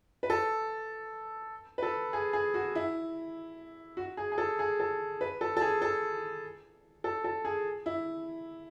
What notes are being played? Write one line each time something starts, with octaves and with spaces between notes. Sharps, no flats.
B4
A4
B4
A4
G#4
G#4
F#4
E4
F#4
G#4
G#4
A4
G#4
A4
B4
A4
A4
G#4
A4
A4
A4
G#4
E4